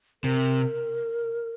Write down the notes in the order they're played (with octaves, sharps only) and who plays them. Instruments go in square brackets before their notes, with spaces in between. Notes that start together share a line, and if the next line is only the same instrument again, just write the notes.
[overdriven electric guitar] C3 [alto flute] A#4